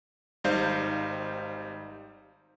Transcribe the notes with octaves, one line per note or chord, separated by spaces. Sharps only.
G#1 G3 D#4 C5 F5 G6